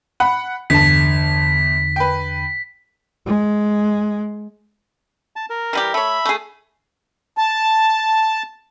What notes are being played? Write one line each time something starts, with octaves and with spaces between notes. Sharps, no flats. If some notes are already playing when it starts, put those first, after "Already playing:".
F#5 B5
G1 E2 D3 A5 B6
B4 G5
G#3
A5
A#4
E3 G3 G4
A3 C#5 E5 B5
A3 G#4
A5